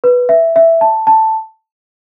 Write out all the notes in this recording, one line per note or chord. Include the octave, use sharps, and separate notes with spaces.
B4
E5
E5
A5
A5